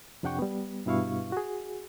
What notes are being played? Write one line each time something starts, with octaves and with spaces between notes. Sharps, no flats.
F2 C3 D4 F#5 G5 C#6
G3 B3
G2 B2 E4 F5 C#6
F#4 G#4